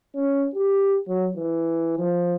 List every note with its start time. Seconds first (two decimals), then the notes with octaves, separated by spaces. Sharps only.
0.15 C#4
0.54 G4
1.08 F#3
1.37 E3
1.98 F3